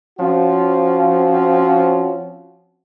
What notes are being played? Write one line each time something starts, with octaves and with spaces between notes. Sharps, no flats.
F3 C4 C#4 F#4